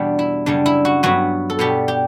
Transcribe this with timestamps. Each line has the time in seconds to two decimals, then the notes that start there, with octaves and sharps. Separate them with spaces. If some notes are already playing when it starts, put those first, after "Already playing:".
Already playing: E2 B2 G3 B3 D4
0.19 E4
0.46 F#2 C#3 G3 D4
0.66 E4
0.85 F#4
1.03 G2 F#3 B3 F#4
1.50 A4
1.59 B2 G3 B3 G4
1.88 G4